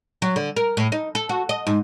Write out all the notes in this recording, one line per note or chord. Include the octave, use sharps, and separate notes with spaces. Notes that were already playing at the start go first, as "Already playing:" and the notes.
F#3
D3
A#4
A2
D#4
A4
F#4
D#5
G#2